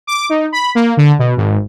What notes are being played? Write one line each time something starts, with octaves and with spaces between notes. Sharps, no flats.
D6
D#4
B5
A#3
D3
B2
G#1